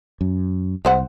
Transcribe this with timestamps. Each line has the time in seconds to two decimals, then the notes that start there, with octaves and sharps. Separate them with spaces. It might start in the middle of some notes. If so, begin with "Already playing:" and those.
0.21 F#2
0.85 C2 G#3 C5 F#5